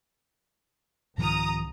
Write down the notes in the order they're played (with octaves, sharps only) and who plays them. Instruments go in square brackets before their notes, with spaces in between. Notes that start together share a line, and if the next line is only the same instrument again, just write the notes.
[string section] C2 A#5 D#6 [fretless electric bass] G#2 D#3 F3